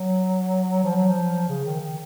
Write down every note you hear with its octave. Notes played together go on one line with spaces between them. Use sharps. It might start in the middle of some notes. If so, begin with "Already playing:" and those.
Already playing: F#3
F3
F#3
F3
C#3
D#3
D#3